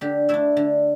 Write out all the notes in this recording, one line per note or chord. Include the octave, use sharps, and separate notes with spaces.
D3 G4
A3 D4 E4 A4
D3